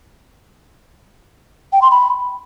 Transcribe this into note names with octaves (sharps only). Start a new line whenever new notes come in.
G5
C6
B5